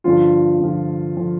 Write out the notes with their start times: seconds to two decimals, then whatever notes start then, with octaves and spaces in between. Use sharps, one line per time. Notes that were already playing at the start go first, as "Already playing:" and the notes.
0.04 G2 D3 F3 F4
0.61 G2 D3 F3
1.17 D3 F3